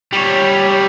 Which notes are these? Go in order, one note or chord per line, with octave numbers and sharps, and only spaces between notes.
G3 C#5